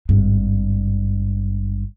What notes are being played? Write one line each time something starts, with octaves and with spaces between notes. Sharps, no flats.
G#1 G2